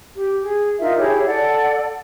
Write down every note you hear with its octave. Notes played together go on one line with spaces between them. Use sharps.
G4
G#4
D#4 F4 A#4 E5
E4 G4 G#4 C#5
A4 D5 F#5